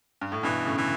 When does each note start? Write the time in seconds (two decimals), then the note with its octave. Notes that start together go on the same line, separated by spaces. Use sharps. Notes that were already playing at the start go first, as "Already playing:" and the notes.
0.21 G2
0.32 A2
0.43 G2 B2 E3
0.65 A2 C#3
0.77 D3 E3